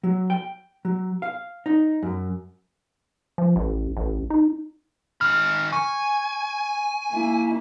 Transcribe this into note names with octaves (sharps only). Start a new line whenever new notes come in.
F#3
G5
F#3
F5
D#4
F#2
F3
A1
A1
D#4
D#3 B5 F6
G#5 C#6
A#3 E4